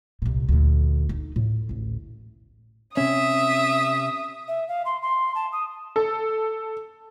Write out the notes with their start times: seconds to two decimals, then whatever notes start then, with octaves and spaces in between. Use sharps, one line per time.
0.22 C2 A#2
0.49 D2 A#2
1.09 D#4
1.36 A2
1.69 A1 D2
2.97 C3 C#4 E5 D#6
4.48 E5
4.68 F5
4.85 C6
5.02 C6
5.35 A5
5.52 D#6
5.96 A4